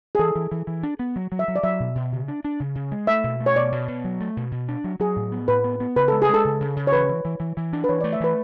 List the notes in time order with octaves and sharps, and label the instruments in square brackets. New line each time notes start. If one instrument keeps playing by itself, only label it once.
[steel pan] G#4
[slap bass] E3 [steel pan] A4
[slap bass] E3
E3
E3
D4
B3
F#3
F#3
[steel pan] E5
[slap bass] F#3
[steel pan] D5
[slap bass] F#3 [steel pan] E5
[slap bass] B2
B2
C#3
D4
D4
C#3
C#3
G#3
[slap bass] A3 [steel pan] E5
[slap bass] B2
A3
[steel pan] C#5
[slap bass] B2 [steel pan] D5
[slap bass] B2
B2
F#3
A3
B2
B2
D4
F#3
[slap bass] F#3 [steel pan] G#4
[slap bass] A2
B3
[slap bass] A2 [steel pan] B4
[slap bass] B3
B3
[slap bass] C#3 [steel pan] B4
[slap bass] G#3 [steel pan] A4
[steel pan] G#4
[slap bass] G#3
[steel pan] A4
[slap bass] C#3
C#3
C#3
[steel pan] C#5
[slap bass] E3 [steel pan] B4
[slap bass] E3
E3
E3
E3
D4
[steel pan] B4
[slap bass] E3 [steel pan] C#5
[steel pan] D5
[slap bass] A3
[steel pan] E5
[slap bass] E3 [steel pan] B4